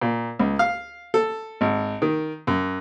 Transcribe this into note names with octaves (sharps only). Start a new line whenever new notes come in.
A#2
C#2
F5
A4
G#1
D#3
F#2